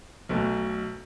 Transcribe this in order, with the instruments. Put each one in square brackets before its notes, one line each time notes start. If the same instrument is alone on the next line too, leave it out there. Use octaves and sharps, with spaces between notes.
[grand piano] B1 B2 A3